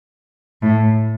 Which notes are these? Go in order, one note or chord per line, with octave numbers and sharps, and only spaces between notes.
A2